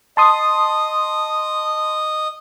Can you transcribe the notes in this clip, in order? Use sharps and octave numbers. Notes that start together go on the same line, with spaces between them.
D#5 A5 C6 D#6